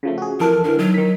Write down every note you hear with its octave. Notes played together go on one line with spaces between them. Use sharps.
C#3 F3 A3
F#4 G#4
F2 E3 A4 A#4
D3 E3 A#4
D#3 F#3
D#3 B6